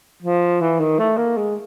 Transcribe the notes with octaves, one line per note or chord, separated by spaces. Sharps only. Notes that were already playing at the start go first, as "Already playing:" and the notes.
F3
E3
D#3
A3
A#3
G#3